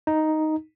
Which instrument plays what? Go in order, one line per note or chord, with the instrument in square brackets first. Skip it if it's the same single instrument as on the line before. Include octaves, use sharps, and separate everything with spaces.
[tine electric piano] D#4